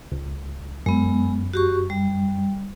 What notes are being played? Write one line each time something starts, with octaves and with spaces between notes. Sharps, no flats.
C#2
F#2 G#3 B3
F#4 G4 C#6
G3